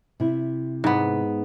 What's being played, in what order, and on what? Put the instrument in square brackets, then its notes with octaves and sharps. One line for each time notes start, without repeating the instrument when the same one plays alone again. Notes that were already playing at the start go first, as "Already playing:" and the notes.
[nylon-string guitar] C3 E4
[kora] G#2 B3